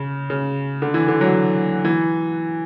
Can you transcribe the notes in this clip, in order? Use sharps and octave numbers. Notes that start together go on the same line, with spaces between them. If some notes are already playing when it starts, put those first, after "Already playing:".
Already playing: C#3
C#3
D3
E3
D3
F#3
E3